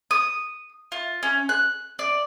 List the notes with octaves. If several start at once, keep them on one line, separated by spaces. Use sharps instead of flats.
D#6
F4
C#4
F#6
D5